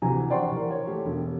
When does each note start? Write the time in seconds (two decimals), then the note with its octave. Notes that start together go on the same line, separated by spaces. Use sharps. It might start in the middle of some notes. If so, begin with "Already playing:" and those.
0.02 D2 C3 E3 G#5 A#5
0.30 C5 D5 F#5 G5 C6 C#6
0.52 E3 A#4
0.71 C#5
0.87 A3 G4
1.05 E1